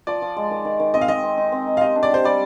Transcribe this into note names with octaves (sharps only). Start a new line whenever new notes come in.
F3 D5
F3
G#3
D#3
D#3
D#3
C4 D#5
F5
C4 D#5
C4
D#4
C4
D#4
F5
G4 D#5
D4
D5
G4 C5
G3 D5